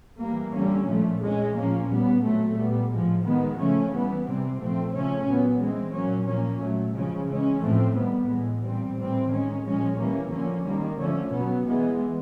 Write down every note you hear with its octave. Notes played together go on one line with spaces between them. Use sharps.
E3 G3 A#3
D3 G3 A#3 C#4
A#2 F3 A3
E3 G#3 C#4
A#2 F3 A#3 C#4
A#2 G3 B3
A#2 F#3 A3 C4
A#2 G3 B3
A2 F3 G#3
D#3 G#3 B3
C#3 F3 A3 C#4
E3 G3 B3
C3 E3 G3 C4
A#2 F3 A3 C4
C#3 F3 A3 C#4
A#2 F#3 B3
E3 G#3 C4
A#2 F#3 A#3 C#4
A#2 F3 A#3 C#4
A#2 F#3 A3
C#3 F3 G#3 C#4
E3 G#3 C#4
A2 F3 A3 C4
D#3 G3 B3
A2 E3 G#3
A#2 G3 C4
A2 E3 G3 C4
D#3 G#3 C#4
A#2 F3 G#3 C#4
E3 G3 A#3 C#4
D3 F3 A#3 C#4
D#3 G3 A#3
D3 F3 A3 C#4
B2 F#3 B3
E3 G#3 B3